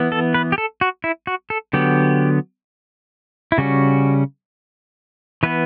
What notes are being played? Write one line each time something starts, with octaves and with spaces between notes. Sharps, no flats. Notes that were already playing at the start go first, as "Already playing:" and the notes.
Already playing: E3 B3
A4
B4
G4
A4
F#4
E4
F#4
A4
D3 F#3 B3 G4
E4
C#3 G3 C#4 F#4
E3 B3 B4